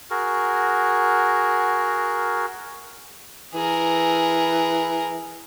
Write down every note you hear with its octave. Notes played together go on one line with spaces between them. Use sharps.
F#4 G#4 A#4
E3 G#4 A#4